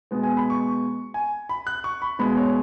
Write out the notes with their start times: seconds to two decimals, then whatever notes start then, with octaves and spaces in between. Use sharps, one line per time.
0.11 B2 G#3 B3
0.23 G#5
0.37 B5
0.50 C#6
1.14 G#5
1.49 B5
1.67 F#6
1.84 C#6
2.02 B5
2.19 B2 G#3 B3 B5
2.37 C#5